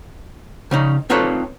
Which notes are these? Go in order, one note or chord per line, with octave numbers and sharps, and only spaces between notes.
C#3 C#4 D#4
C4 D#4 F4 A4 B4 C#5